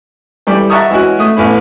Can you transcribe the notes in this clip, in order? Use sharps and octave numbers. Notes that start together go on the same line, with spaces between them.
E3 G3 A4 D5
E5 F#5 A5 A#5 C#6 D#6
E3 G#3 C#4 F#4
A3 D#6
A1 A2 B3 C#4 B5